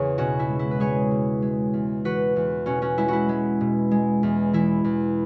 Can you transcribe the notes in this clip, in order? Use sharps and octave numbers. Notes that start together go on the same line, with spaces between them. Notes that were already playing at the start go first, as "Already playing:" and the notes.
Already playing: E2 C#3 G#4 C#5
B2 C#4 F#4
E4
G#3
E4
B4
G#3 G#4 C#5
B2
G#3
E2
E3 F#4 B4
E2
B2 C#4 F#4
C#4 F#4
G#3 E4
E4 F#4
G#3
B2
G#3
E2
E3 E4
E2